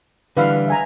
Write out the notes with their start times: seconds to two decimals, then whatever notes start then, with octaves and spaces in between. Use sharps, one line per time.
0.37 D3 E3 G3 B4 F5
0.68 E5 G#5 A#5